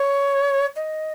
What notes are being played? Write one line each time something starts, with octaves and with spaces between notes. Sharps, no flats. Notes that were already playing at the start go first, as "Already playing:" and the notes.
Already playing: C#5
D#5